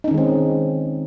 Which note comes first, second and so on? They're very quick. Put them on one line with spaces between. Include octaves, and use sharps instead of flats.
D#4 C#4 D#3 G#3 C4